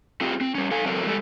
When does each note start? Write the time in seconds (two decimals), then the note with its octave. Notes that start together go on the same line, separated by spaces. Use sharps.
0.21 C4 F4 G4 G#4
0.41 C4
0.55 G3 C#4
0.71 A4 F5 G#5
0.86 F#3 C4 F#4 A4 A#4 D5
1.06 G3 G#3 G4 A4 D5